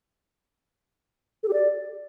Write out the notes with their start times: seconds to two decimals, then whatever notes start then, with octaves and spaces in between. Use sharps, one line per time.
1.43 A4
1.48 G4
1.53 D5